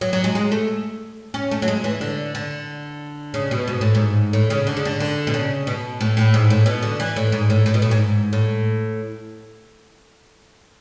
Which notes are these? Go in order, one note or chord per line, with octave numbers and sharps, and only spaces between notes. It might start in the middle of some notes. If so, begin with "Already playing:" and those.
F#3
F#3
G#3
G#3
A3
C#4
A3
F#3
G#3
E3
D3
D3
C#3
B2
G#2
A2
G#2
A2
C#3
D3
C#3
D3
D3
B2
C#3
B2
A2
A2
G#2
A2
B2
D3
E3
A2
G#2
A2
A2
B2
A2
G#2
A2